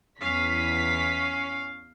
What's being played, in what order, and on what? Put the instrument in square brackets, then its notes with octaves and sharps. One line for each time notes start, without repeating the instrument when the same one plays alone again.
[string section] E2 B6 [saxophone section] C#4 [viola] F5